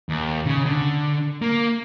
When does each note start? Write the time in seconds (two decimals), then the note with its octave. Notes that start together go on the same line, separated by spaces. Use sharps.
0.09 D#2
0.46 C#3
0.66 D3
1.42 A#3